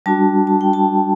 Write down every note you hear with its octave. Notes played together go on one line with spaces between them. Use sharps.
G3 D4 F#4 A5
A5
G5
A5